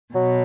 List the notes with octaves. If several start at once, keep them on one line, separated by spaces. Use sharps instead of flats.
B2 F#3